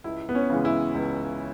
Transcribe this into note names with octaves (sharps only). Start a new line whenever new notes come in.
C#2 E4
B3
C#4
C#3 E3 G#3
E4
C#2